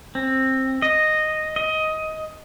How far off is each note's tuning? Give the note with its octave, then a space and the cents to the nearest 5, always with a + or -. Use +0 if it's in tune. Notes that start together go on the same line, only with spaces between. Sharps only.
C4 +15
D#5 -5
D#5 +15